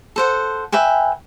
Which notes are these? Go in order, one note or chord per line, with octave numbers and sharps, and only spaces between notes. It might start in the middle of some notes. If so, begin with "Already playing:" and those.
A4 C5 F#5
B4 E5 G5 G#5